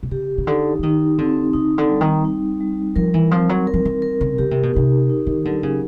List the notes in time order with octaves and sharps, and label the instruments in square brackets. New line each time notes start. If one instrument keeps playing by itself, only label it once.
[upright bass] C3
[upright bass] C#3 [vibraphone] G4
[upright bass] C#3
[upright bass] D3 [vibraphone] D#4
[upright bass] E3
[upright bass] D#3 [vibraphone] D#4
[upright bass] D3 [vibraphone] C4
[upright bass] C#3 [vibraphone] D#4
[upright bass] D3
[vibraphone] G3
[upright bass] D#3
[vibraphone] D#4
G3
[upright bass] F3 [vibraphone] A#4
[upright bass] E3
[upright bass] F3 [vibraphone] C4
[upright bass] F#3
[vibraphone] A#4
[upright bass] F3
E3
[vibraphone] A#4
[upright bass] C#3
[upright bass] C#3 [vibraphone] G4
[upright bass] C3
B2
[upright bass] C3 [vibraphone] D#4
[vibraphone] D#4
[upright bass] D#3
[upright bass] D3 [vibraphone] F#3
[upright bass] C#3